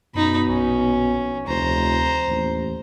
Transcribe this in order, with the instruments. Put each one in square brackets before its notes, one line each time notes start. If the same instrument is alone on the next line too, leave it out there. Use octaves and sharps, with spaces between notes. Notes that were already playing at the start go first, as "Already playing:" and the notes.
[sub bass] F#2 [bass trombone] B2 [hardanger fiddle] D#4 B5
[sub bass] A#1 [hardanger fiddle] C#4
[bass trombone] F1 [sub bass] D2 [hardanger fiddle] C5 A#5
[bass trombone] A1 [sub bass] D#2